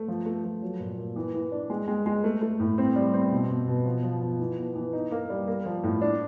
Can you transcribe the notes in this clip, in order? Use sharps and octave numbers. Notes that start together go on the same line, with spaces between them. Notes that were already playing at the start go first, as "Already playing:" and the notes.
Already playing: A3
F3
A3
F3
F#3
A#2
A#2
E3
E3
D4
G#3
G#3
G#3
A3
A3
A2
C4
G3
C4
B2
B2
B2
F3
F3
F3
E3
B3
E3
D#4
A#3
G3
A#3
F3
A2
D4